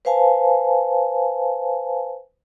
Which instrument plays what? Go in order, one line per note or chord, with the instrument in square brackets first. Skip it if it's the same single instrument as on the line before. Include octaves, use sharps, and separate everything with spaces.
[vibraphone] B4 C5 F5 G#5 A5